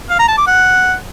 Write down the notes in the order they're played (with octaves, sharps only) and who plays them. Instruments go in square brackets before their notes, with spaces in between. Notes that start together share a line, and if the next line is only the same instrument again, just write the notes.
[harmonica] F5
A#5
A5
D6
F#5